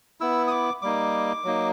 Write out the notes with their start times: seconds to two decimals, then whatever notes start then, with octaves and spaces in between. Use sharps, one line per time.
0.20 B3 E4 E6
0.47 D#6
0.51 D6
0.82 G3 A#3 D#4 D6
1.44 F#3 A#3 D#4